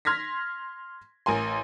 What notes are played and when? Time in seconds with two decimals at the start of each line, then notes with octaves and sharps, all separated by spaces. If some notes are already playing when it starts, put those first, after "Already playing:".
0.05 C6 F6 G#6 A#6 B6
1.26 A1 A#4 G#5 C6